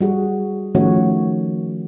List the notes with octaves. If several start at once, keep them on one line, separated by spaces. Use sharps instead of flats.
G3 F#4 G#4
D#3 F3 A3 C#4 F#4 C#5